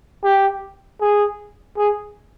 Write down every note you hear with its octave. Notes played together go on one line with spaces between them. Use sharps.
G4
G#4
G#4